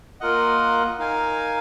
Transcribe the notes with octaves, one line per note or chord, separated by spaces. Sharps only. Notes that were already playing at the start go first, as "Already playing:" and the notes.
A#3 F4 A#4 D#5 F#5
D#4 A#4 F5 G#5